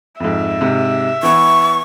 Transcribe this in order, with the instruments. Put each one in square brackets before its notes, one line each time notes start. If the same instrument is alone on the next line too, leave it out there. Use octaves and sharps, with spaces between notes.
[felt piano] F2 G#2 [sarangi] E5
[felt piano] G#2 C3
[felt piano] E3 B3 [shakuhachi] C#6